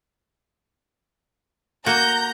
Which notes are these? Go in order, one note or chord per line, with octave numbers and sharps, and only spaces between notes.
A#3 F#4 A#5 G6